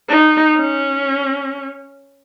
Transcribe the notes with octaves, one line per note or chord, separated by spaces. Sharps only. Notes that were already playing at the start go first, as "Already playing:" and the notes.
D#4
C#4